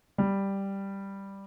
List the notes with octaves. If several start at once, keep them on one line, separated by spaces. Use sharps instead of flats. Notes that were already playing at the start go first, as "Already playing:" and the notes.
G3